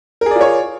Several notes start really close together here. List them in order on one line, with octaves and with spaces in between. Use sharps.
A#4 G#4 D5 F4 C#5